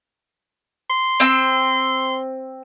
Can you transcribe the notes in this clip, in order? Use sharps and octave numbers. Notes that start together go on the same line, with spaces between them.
C6
C4 E6